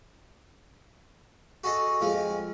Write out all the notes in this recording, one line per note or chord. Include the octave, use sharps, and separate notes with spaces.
F#4 G#4 A4 D#5
F2 F3 G#3